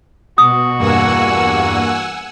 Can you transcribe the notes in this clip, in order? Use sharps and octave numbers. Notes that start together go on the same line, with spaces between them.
B2 F#4 D#6
E2 G2 A#3 F#5 G#5 E6